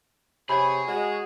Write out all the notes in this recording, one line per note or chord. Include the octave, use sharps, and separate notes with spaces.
C3 G#4 C#5 G#5 A5 B5
G#3 F#4